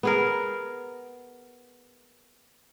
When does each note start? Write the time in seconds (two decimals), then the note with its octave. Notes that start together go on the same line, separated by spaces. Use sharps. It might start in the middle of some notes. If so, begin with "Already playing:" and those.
0.03 B3 G#4 A#4